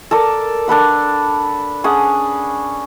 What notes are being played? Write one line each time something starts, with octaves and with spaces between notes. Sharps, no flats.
A4 A#4 D5
D4 A4 B4 F#5
C#4 D4 G#4 F#5